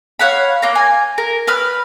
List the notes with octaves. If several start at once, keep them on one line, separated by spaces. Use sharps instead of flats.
C#5 F5 F#5 B5
A#3 A#5
G#5
A#4
B4 B5 F6